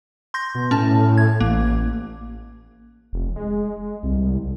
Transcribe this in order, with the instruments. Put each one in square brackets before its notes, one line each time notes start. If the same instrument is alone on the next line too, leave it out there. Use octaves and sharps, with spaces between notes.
[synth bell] C6 G6 A#6
[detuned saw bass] B2
[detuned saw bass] A2 [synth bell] C#4 A5
[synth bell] G#6
[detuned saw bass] A1 [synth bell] A#3
[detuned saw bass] F1
G#3
C2